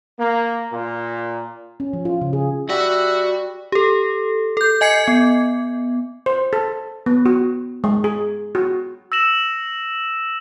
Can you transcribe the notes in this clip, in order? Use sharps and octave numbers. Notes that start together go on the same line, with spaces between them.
A#3
A#2
C#4
F3
F4
C#3
G#4
G3 F#4 E5 F#5
G4 A4
A4 G6
D#5 G#5 G#6 C7 C#7
B3
C5
A4
B3
F#4
G#3
G#4
F#4
E6 A#6 E7 F#7